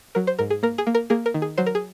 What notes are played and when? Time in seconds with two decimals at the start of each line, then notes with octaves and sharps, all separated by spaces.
0.15 F#3 A#4
0.27 C5
0.39 G#2 A#4
0.50 G#4
0.63 A#3 A#4
0.78 G#4
0.87 A#3
0.95 A#4
1.10 A#3 G#4
1.26 A#4
1.34 D#3
1.42 G#4
1.58 F#3 C5
1.66 A#4
1.75 G#4